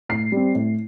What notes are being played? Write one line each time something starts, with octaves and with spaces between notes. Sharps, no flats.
A2 C7
G3 C4
A2